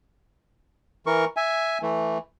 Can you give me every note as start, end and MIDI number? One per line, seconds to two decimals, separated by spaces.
1.06 1.25 52
1.06 1.25 70
1.06 1.25 85
1.37 1.78 76
1.37 1.78 80
1.82 2.18 52
1.82 2.18 57